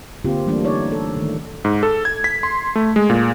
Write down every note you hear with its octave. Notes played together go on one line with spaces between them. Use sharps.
D3 A#3 C4 F4 G4
E3 G3 A3 A#3 D4
D#4 C#5 D5
A4
D#3 A3
G#2
A4
G#6
B6
C6
A3
G#3
A#2